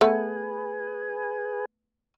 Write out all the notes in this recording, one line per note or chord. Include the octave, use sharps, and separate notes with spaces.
A3 B3 G#4 B4 G#5